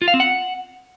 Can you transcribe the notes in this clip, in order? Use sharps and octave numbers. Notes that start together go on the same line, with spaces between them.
F4
F5
C4
F#5